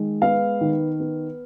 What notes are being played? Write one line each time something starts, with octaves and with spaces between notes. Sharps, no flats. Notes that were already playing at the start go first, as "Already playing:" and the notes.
Already playing: D#3 G#3
B3 F5
D#3
B3